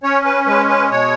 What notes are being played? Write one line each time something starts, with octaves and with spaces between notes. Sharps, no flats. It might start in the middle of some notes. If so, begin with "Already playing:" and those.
C#4 C#5
B4
G#3 B4
B4
B2 C#5